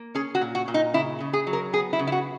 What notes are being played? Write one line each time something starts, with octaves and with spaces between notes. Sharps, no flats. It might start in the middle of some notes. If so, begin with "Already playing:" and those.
Already playing: A#3
C#4 G#4
F#4
A#2
F#4
A#2
D#4
C#3 E4
C#3
G#4
F#3
A#4
B3 G#4
E4
C#3
E4
F#4